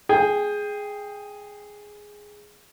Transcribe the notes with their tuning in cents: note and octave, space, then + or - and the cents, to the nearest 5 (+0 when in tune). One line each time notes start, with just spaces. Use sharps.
G#4 +0 G5 +20